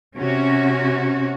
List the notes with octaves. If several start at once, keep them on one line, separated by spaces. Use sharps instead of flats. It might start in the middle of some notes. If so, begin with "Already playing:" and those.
C3 C#4 F#4